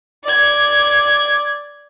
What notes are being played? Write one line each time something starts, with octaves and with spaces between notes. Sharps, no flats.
D5 G#6